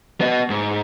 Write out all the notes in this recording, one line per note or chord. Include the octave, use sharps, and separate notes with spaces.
B3 D#5
G#2